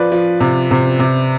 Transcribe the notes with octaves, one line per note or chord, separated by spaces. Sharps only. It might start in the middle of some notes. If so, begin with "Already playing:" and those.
Already playing: F3 B4 D5
F3
C3
C3
C3